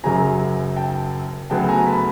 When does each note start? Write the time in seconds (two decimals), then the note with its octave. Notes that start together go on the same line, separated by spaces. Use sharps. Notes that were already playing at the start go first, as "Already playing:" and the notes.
0.04 F#1 F#2 C#3 F#3 G#5 A#5
0.76 G5 A5
1.50 D2 C#3 F#3 B3 G5 A5
1.68 G#5 A#5
1.86 A5 B5